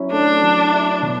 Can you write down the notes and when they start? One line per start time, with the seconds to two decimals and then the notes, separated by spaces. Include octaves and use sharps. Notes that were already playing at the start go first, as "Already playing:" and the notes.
Already playing: F#3 C#4 E4
0.12 A3 D4
0.42 F#3
0.72 E4
1.02 B2